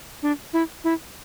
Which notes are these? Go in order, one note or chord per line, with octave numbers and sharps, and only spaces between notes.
D4
E4
E4